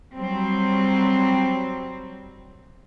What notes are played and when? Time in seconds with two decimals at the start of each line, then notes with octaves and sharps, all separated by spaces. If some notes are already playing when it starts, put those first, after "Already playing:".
0.15 F#3 G3 C4